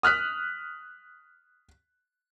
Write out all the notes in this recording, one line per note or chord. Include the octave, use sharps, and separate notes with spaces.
D#6 F6 F#6 B6